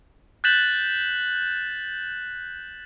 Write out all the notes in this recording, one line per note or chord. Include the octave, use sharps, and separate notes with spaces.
F#6 G6 A6 B6 E7 F#7